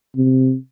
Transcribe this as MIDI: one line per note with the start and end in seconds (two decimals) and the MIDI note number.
0.16 0.55 48